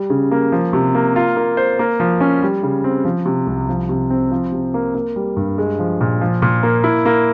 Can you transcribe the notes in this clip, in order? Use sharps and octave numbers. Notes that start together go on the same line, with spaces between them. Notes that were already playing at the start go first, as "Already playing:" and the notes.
Already playing: G3
C#3
A#3
F3
C3
A#3
F4
A#3
C5
A#3
F3
C#4
G3
C#3
C4
F3
C3
C2
F3
C3
C4
F3
C3
A#3
A#3
G3
G2
G#3
F3
A#2
F3
A#2
A#3
E4
A#3